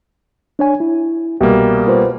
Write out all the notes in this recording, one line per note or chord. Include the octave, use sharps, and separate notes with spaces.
D4 C#5 G#5
E4
C2 B2 G3 A#3 G4 E5
F4 B4 C5